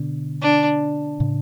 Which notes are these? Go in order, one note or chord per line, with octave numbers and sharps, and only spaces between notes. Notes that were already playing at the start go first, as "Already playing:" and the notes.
Already playing: B2 D3
D4
A2 C#3